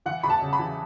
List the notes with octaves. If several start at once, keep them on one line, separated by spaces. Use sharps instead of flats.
E3 F#5
E2 B5
A5
C#3
B5
E3